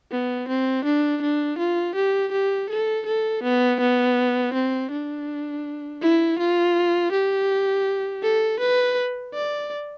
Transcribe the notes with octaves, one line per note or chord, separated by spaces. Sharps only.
B3
C4
D4
D4
F4
G4
G4
A4
A4
B3
B3
C4
D4
E4
F4
G4
A4
B4
D5